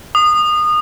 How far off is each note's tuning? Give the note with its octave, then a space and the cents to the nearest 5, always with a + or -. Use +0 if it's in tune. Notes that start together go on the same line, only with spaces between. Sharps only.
D#6 -25